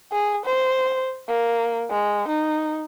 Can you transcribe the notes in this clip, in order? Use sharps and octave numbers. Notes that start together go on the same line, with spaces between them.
G#4
C5
A#3
G#3
D#4